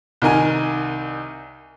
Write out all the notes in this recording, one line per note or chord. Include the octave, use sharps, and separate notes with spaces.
C2 D#3 A#4 G#5